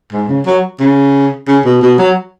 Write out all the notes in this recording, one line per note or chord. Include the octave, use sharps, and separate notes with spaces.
G#2
C#3
F#3
C#3
C#3
B2
B2
F#3